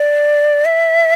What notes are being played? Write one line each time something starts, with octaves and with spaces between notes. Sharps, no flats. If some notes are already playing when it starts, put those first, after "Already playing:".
Already playing: D5
E5